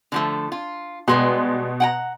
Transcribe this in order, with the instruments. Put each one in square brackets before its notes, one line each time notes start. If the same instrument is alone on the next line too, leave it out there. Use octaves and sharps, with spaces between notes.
[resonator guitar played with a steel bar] D3 F3 A3
F4
[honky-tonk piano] B2 C6 [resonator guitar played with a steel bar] G3 G#3 B3
[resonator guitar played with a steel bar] F#5 G5 A#5